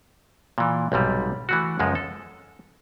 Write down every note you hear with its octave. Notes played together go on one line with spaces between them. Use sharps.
A#2 E3
B1 G#2 C3 G3
E3 A3 F#4
C#2 F#2 F3 G#3
A4